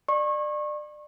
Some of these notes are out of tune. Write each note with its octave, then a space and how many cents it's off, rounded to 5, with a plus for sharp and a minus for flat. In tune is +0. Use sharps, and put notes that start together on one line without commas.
D5 +30 C#6 -30